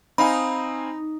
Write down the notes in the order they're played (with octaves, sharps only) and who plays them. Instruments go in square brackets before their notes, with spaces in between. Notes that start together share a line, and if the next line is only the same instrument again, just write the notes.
[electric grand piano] C4 F5 G#5 [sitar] D#4 [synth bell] B5